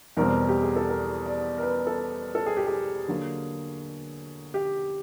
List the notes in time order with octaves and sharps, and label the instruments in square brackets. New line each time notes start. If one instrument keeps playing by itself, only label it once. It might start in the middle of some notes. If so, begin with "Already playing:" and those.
[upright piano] E2 B2 G3 C4 A#4
G4
G#4
A4
A#4
D5
A#4
B4
A4
A4
G#4
G4
G#4
D3 F#3 A#3
G4